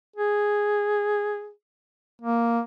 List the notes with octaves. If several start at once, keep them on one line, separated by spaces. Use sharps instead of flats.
G#4
A#3